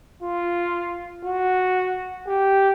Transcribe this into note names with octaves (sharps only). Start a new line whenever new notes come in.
F4
F#4
G4